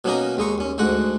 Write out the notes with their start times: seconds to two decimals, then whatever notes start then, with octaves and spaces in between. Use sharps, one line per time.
0.05 B2 F#3 A#3 C#4 D#4 A#4
0.37 D#2 G#3 D#4 C#6
0.58 D#2 C#4
0.78 D2 G#2 G#3 F#4 F#5